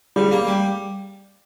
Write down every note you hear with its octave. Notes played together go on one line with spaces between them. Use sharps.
C#3 G3
A#3
G3